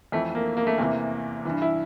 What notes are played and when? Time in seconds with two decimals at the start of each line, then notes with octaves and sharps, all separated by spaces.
0.12 F2 E3 A3
0.35 A#3
0.57 A#3
0.67 A3
0.78 E2 C3 E3 A#3
1.45 G2 E3
1.62 E4